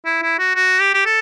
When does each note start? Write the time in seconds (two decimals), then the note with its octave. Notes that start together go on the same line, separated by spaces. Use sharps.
0.05 E4
0.23 E4
0.39 F#4
0.56 F#4
0.80 G4
0.94 G4
1.06 A4